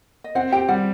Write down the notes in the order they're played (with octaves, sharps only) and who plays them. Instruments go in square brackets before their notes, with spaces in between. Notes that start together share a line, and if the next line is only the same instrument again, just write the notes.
[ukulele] D#5
[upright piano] C4 [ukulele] F#5
[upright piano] G4 [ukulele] G5
[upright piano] G3 [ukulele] F#5